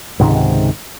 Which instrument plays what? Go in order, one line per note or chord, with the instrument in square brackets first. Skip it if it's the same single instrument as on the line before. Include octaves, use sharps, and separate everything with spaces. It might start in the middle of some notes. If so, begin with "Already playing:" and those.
[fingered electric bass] C#2 G#2 C3 D#3